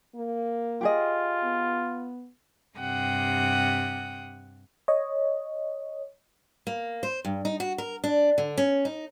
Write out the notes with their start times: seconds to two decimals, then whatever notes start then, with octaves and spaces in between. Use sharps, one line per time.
0.16 A#3
0.81 F4 G4 G#4 D#5
1.44 B3
2.78 G2 C3 F#5 G5 D#6
4.88 C#5 D#5
6.67 A#3
7.03 C5
7.25 G2
7.45 D#4
7.60 F#4
7.78 A#4
8.04 D4
8.38 D3
8.58 C#4
8.85 D#4